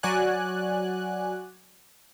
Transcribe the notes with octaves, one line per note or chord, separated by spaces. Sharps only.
F#3 F#4 D5 G#5 F#6